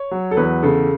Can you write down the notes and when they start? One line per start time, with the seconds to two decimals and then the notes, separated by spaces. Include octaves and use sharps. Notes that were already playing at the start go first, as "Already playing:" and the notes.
Already playing: C#5
0.11 F#3
0.31 A4
0.37 E2 B4
0.63 C#3 A4